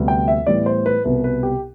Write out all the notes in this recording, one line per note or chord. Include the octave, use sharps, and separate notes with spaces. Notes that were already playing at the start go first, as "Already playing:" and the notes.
Already playing: D2 C3 G3 B3
G5
E5
A2 E3 G3 B3 D5
C5
B4
C2 B2 B3 B4
B4
G4